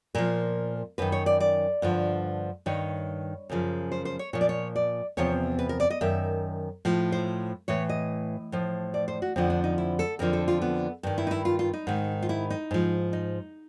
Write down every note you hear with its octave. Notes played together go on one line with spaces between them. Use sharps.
A#2 F3 A#4
F#2 D#3 B4
C#5
D5
D5
G2 D3 F3
G2 D#3 C#5
F#2 C#3 F3
C5
C5
C#5
A#2 F3 C#5
D5
C#5
D5
E2 C3 F3 C#5
B4
A#4
D5
D#5
F#2 D#3 E5
A2 F3
C5
A2 E3 C#5
D#5
A2 F3
D5
C5
F#4
F2 D3 F3 C4
D4
D#4
E4
A4
F2 D3 F3 A#4
A4
F4
B3
G2 D#3
E4
D#4
E4
F4
F4
D#4
G#2 D#3
F4
E4
D#4
G#2 F3
D#4